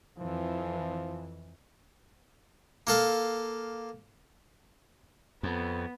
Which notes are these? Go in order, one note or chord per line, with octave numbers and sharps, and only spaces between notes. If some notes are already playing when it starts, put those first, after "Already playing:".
F2 E3 F3
A#3 A4 F5
F2 B3